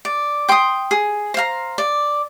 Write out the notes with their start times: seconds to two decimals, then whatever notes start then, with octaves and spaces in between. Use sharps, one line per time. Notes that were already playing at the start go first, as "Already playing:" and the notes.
0.05 D5
0.49 G5 C6 D#6
0.91 G#4
1.34 C5 F5 A#5
1.78 D5